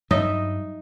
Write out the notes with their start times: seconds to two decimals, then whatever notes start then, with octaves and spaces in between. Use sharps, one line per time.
0.11 G2 F#3 D#4 D#5 E5